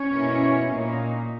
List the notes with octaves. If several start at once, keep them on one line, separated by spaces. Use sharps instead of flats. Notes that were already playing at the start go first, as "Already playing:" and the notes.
Already playing: C#4 C#5
B2 A#3 E4
A#2 A#3 D#4